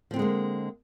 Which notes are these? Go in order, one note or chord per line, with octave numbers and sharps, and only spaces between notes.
D3 F3 G#3 A#3 C4